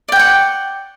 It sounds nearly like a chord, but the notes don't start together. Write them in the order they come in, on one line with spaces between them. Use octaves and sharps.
D5 G5 F#5 C#6